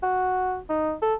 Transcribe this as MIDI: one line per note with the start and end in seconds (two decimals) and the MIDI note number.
0.03 0.58 66
0.69 0.94 63
1.02 1.14 69